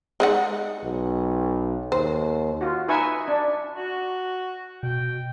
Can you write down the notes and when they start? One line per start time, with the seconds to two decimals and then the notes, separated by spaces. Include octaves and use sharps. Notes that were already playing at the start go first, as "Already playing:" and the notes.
0.20 G#3 D#4 F#5
0.84 B1
1.92 D#2 C5
2.61 F4 F#4
2.88 D#4 B4 E5 G#5 C#6
3.28 D4
3.77 F#4
4.83 B2 G5